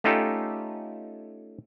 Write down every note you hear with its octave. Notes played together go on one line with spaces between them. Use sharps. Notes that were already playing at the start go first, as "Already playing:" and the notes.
A3 C#4 D#4 F4 G4 A4